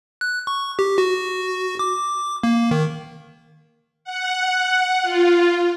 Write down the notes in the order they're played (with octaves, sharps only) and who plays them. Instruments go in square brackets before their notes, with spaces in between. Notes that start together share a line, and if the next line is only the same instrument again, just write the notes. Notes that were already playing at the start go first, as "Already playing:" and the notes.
[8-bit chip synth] F#6
C#6
G4
F#4
D6
A#3
D#3
[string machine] F#5
F4